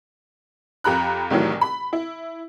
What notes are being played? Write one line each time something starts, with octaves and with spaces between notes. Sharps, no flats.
F2 G4 A#5 B5 F#6
C2 A2 D#3 E3 F#3
B5
E4